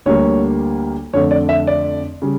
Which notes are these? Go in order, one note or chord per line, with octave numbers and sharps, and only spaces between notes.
D2 D3 G3 A#3 C#5
F2 D3 A3 C#5
D5
E5
D5
C#3 G3